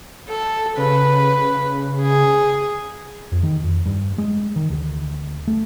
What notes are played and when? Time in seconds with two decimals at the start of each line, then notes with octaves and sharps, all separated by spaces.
0.29 A4
0.77 C#3 B4
2.02 G#4
3.32 F2
3.43 D#3
3.64 F2
3.86 G2
4.18 G#3
4.56 D#3
4.70 D2
5.48 A3